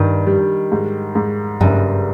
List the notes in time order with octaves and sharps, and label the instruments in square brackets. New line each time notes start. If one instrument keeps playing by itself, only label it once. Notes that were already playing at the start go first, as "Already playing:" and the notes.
Already playing: [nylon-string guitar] G2 [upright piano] D#3
[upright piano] G3
G#2
G#2
[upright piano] F#1 [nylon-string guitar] G2